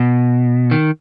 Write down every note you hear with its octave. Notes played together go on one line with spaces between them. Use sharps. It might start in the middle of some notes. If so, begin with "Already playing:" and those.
Already playing: B2
D#3